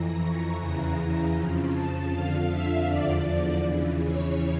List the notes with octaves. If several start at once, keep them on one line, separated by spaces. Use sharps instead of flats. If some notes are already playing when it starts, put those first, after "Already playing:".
Already playing: F2 E3 A#5
C#6
E2 C#3 E3 A#5
A#5
F2 C#3 F3
A5
F2 D3 F3 F5
E5
E2 D3 F3 D5
E2 C#3 E3
C#5